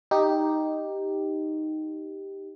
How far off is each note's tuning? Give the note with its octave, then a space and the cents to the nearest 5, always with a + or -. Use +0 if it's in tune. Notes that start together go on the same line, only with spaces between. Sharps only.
D#4 +0 G4 +0